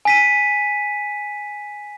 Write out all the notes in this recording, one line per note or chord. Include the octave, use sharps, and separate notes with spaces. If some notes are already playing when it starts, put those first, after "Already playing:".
G#5 B6 D#7